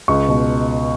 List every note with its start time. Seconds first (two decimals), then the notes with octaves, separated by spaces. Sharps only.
0.08 C#2 C#6
0.28 B2